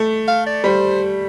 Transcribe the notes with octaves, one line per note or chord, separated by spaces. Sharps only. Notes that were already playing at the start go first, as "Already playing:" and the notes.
Already playing: A3
F5
D5
G3 C5